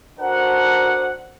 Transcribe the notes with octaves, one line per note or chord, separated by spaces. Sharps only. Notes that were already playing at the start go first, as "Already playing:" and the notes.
D4 F#4 A4 A#4 C5 F#5